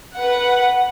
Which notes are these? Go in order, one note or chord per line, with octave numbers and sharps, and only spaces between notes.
B4 F#5